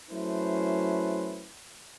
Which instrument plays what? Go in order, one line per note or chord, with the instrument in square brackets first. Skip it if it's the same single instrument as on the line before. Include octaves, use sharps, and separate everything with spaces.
[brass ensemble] F#3 A3 C#4 E4 B4 C5